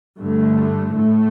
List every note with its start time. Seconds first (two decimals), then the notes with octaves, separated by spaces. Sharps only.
0.18 G2 D3 A3
0.91 A2 A3